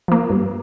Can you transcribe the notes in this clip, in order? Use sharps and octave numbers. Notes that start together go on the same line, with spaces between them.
F3 A#3
G2